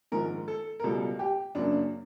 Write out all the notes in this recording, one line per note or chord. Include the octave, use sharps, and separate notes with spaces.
A#1 G#2 D#3 A#4
A4
A#4
C#2 B2 G3 A4
G4
F#2 C#3 F#3 A#3 D4